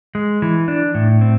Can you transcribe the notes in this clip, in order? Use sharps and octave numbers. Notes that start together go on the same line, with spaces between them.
G#3
E3
D4
A2
C4